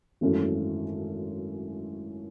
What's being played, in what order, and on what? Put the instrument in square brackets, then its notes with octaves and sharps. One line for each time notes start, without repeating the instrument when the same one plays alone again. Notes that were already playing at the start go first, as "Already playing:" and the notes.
[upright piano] G#1 F#2 E3 A3 C#4